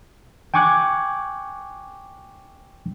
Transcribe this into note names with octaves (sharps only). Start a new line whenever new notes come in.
G5 G#5 C#6 D6 F#6 G#6